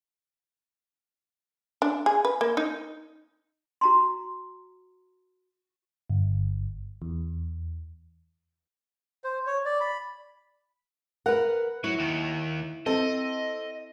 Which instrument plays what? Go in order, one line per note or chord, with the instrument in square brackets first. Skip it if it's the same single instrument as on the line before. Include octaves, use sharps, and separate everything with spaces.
[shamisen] D4
G#4
B4
A#3
D#4
[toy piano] F#4 A#5 C6
[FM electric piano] G1
E2
[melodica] C5
C#5
D5
B5
[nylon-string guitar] A#4 B4 [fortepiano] F#5
[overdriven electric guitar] F#3 [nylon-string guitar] E4
[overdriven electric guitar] D#2 D#3
[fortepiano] C4 A4 [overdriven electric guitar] D#5